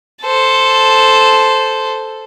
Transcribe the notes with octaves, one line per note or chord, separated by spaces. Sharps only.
A4 C5